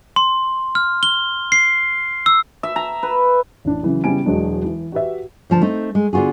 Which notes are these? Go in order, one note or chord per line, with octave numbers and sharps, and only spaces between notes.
C6
F6
G7
C7
E6
E5
A#5
B4
A1 D4
C#3 E3 F#3
C#3 G3 B3 E4 G#5 D7
E1 F#3 G#3 D4
E3
F#4 G4 B4 E5
D2 F3 A5
A3 C4 D#4
G#3
D3 B3 F4 F#4 G#4